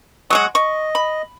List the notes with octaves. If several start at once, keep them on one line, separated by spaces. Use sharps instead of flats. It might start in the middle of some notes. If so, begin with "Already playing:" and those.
F#3 G#3 F#4 C#6 D#6
D#5 C#6
B5